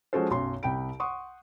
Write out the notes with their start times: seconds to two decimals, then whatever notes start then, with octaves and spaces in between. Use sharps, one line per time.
0.13 F3 G#3 C#4 F#4 A4 C5
0.30 B1 F#2 C6
0.63 C2 G5 B5 D7
1.00 F#5 C6 C#6 D#6